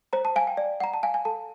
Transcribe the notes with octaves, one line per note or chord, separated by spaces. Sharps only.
C5 A#5
A5
F5 G#5
G5
D5
F#5 A#5
A5
F5 G#5
G#5
A4 A5